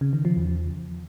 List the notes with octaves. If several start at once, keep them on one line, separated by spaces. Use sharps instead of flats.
C#3
D#3
F3
E2